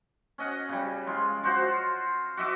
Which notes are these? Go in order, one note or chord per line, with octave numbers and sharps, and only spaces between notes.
C#4 D#5 F#5
C#3 G3
G#3 F4
F4 F#4 C5 C6
F#4 D#5 E5 D6